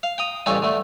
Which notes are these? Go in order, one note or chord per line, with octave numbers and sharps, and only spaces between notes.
F5
G5 A#5 D#6
A1 G2 C#3 C#4 D#4 A4
D3 A3